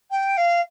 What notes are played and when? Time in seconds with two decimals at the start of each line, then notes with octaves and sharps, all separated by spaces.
0.11 G5
0.37 F5